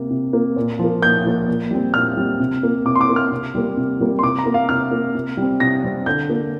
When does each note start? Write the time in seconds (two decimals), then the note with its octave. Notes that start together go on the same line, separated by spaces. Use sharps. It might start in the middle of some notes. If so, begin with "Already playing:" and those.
Already playing: C3 A#3
0.10 C3
0.33 A#3
0.56 A#2
0.79 F3 A#3
1.02 A#2 G6
1.25 F3 A#3
1.48 A#2
1.71 G3 C4
1.94 A#2 F6
2.17 G3 C4
2.40 C3
2.63 A#3
2.86 C3 D6
2.95 C6
3.01 D6
3.09 A#3
3.16 F6
3.32 C3
3.55 G3 A#3
3.77 C3
4.00 G3 A#3
4.19 C6
4.23 C3 D6
4.39 A#5
4.46 A#3
4.54 F5
4.69 C3 F6
4.91 A#3
5.15 C3
5.37 G3 C4
5.60 C3 A#6
5.84 G3 C4
6.06 D3 G6
6.29 A#3